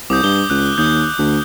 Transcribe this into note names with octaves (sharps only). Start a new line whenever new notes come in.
C2 D6 D#6 G6
G2 D6 G7
C#2 F#6
D#2 D#6 G6
D2